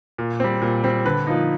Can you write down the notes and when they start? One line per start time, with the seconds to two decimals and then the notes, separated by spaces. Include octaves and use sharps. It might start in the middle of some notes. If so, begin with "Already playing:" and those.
0.18 A#2
0.40 G3 C4
0.62 A#2
0.83 G3 C4
1.05 D3 B4
1.27 F3 A#3 D#4